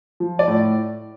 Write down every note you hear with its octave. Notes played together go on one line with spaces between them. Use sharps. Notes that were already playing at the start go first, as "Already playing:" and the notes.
F3
D5
A2